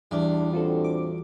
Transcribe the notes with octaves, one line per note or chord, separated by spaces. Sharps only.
E2 G3 D4 E4
A2 C4 D4 F4 F#4 A4
D6